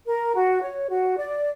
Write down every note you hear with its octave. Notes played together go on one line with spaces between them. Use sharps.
A#4
F#4
C#5
F#4
D5